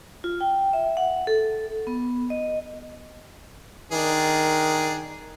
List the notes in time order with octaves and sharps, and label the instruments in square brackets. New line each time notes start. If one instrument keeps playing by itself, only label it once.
[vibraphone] F4
G5
E5
F#5
A4
B3
D#5
[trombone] D#3 [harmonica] D4 G#4